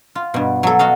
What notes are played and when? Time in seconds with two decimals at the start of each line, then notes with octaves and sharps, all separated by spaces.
0.15 F4
0.34 G2 B2
0.63 F#3 A4
0.79 F#4 D#5 F5